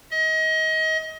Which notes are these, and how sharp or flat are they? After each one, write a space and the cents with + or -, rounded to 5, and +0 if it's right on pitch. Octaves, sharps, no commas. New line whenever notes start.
D#5 +30